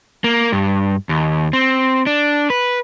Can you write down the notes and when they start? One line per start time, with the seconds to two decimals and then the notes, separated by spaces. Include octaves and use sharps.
0.24 A#3
0.52 G2
1.09 D#2
1.53 C4
2.07 D4
2.50 B4